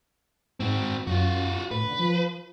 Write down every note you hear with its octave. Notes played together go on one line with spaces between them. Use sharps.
G#2 C4 F#4
F#2 F4 F#4
A2 B4
D3
F3